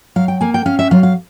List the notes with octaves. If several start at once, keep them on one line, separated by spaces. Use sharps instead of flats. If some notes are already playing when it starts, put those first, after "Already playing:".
F#3 F5
G5
A#3 G#5
G5
C#4 F5
E5
F#3 F5
F5